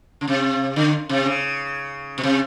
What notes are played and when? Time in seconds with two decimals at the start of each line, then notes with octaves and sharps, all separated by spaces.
0.21 C#3
0.28 C3
0.76 D3
1.09 C3
1.26 C#3
2.18 B2
2.24 C3